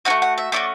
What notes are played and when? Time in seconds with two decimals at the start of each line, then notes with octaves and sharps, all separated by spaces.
0.05 A3 C#4 F#4 F#5
0.22 F#5
0.38 E5
0.52 A3 C#4 F#4 D5